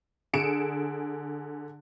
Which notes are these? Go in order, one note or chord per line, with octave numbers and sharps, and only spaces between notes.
D3 G#4 C#7 D7 E7